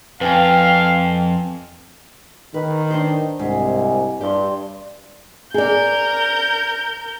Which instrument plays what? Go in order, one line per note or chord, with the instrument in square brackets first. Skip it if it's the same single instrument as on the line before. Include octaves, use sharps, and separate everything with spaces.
[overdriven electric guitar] F2 [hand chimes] B4 G5 G#5 [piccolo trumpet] F5
[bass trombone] D#3 [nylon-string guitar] B4
[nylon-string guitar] D4 C5 [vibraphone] A#4
[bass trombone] C2 [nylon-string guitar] G#2 [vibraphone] D#5 F#5 G#5
[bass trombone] G2 [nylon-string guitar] G4 [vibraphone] D5 C6
[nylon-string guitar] G#4 D5 [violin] A#4 G6